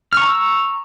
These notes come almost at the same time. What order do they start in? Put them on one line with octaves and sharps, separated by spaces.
F6 C#6 A#5 E6